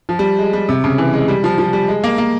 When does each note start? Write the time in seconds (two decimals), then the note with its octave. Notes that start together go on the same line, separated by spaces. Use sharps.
0.09 F3
0.19 G3
0.39 G#3
0.53 G3
0.69 C3
0.84 C#3
0.98 E3
1.13 G#3
1.28 G3
1.44 F3
1.58 F3
1.73 G3
1.88 G#3
2.04 A#3
2.18 A#3